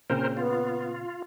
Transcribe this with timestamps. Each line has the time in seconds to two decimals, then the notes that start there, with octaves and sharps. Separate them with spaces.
0.10 A#2 C#3 C4 A#4 C5
0.37 B3 F4